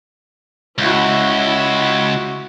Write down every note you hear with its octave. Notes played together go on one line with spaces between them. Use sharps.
C#2 E4 F#4